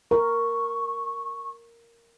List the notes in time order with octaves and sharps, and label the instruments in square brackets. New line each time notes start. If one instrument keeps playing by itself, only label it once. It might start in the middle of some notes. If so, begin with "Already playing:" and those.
[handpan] A#4 [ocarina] C#6